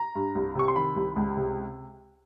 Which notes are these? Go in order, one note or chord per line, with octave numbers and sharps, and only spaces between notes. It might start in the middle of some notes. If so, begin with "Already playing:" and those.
Already playing: A#5
G2
C2
C3 C#6
C6
D#3 B5
C2
C#2
C3